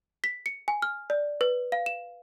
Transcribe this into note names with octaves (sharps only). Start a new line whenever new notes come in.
B6
C#7
G#5
F6
D5
B4
F5
E7